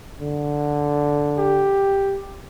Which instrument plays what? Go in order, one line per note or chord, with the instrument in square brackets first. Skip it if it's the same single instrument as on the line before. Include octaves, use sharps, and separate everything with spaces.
[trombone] D3
[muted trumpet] G4